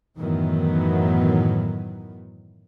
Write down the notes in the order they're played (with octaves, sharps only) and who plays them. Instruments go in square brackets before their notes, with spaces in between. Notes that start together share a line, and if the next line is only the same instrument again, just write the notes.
[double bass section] F#2 A2 D#3 E3 F#3 B3